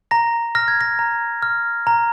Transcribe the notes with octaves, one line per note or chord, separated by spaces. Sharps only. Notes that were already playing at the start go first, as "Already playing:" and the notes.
A#5 A#6
F6 A#6
G#6
A#6
A#5
F6
A#5